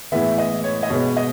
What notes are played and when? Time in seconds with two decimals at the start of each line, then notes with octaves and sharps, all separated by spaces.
0.12 A2 E3 G#3 B3 E5
0.38 D#5
0.64 C#5
0.83 D#5
0.90 B2 G#3 B3 C#5
1.17 D#5